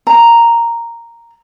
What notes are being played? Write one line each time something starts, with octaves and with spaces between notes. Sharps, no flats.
A#5